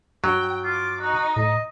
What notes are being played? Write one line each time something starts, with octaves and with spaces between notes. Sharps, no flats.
G2 F#3 G5
F4 D6
D#4 F#4
A2 D#5